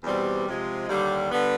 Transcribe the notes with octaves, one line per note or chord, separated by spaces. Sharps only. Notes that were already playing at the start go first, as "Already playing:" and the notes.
E2 B2 G3 C4
C3 F3 G#3
D#2 D3 G3
D3 G3 B3